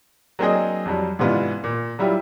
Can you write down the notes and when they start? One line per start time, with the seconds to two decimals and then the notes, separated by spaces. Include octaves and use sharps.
0.39 F#3 A#3 C4 D4 G#4 D#5
0.85 F2 F#3 G3
1.19 G#2 C3 E3 B3 D4 F4
1.64 A#2
1.99 F#3 G3 E4 F4 G4